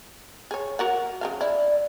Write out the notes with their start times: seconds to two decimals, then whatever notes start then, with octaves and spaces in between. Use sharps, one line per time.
0.51 G#4 C#5
0.79 F#4 A#4 F#5
1.21 C#3 F#3 F5
1.41 E4 D5